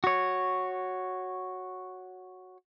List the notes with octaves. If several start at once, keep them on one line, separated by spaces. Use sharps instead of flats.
F#4 C#5